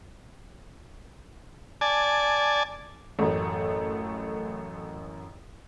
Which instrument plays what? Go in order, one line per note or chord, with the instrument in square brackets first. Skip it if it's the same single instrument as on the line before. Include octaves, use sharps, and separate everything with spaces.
[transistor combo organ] D5 G#5 A5
[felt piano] A1 F#2 [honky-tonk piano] A3